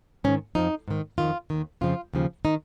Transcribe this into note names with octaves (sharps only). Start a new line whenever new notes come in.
G#2 D#3 C#4
F2 F3 D#4
G#2 D#3
F2 D#3 F4
D#2 D#3
F2 C#3 F3 F4
D#2 C#3 F3
D#3 D#4